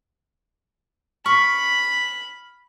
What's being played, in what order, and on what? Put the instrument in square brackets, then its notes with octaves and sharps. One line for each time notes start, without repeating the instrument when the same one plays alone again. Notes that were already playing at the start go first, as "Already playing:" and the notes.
[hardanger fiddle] B5 [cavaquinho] C#6 [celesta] F6 B6